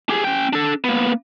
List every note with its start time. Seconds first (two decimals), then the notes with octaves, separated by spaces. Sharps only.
0.10 G4 G#4
0.25 C#4 G5
0.53 D4 A4
0.84 A#3 B3